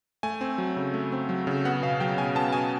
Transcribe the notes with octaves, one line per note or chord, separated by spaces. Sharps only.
A3 G#5
C4
F#3
C#3
A3
C4
F#3
C#3
B3 F#5
B2 F5
F#3 G5
B2 G#5
B3 A5
B2 G#5